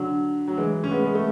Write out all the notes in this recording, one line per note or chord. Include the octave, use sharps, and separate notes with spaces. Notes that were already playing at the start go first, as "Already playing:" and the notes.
Already playing: D3 F#3
F#3
E3 G#3
C#4
G#3 B3
G#3
A3